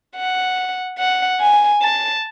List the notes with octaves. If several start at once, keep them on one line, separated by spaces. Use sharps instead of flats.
F#5
F#5
G#5
A5